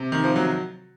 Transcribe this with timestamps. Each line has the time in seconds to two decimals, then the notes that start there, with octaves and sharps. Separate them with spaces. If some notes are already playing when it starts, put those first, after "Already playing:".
Already playing: C3
0.12 D#3
0.24 F3
0.36 F#3